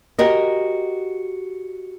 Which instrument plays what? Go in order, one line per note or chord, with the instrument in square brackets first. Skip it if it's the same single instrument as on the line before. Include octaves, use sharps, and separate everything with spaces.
[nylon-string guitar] F#4 G4 A#4 D#5